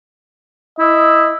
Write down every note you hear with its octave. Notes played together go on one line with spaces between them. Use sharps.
E4 D#5